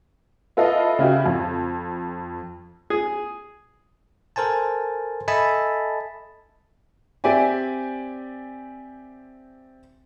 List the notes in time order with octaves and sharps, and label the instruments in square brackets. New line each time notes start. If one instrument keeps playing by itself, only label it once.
[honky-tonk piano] E4 F4 A4 B4 D#5 F5
C#3 E4 F#4 G4
F2
[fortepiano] G#4
[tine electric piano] A4 A#4 C5 G#5 A5
A4 D#5 E5 G#5 A5 B5
[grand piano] C4 G4 D5 E5 G#5